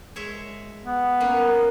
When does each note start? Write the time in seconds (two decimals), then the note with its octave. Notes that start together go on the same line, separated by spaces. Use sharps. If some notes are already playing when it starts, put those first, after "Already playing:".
0.16 G#3 C#5 E5
0.85 B3
1.20 A#3 C#4